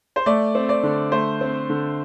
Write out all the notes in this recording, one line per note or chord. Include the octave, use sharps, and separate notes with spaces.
C5
A3 D5
C4
D5
D3
A3 C5
C4
D3